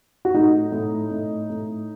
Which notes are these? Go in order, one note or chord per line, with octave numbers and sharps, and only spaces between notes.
F#4
A2 D#4
A2
A2
A2